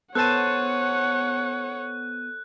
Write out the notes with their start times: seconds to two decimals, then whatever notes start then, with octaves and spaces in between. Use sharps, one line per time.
0.15 B3 A4 C5 C#5 F#5 A5 F#6 D#7